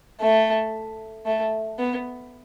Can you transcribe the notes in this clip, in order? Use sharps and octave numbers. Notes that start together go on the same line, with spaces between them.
A3
A3
B3